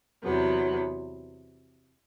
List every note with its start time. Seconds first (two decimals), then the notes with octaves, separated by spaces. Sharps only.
0.23 E2 C3 F#3 B3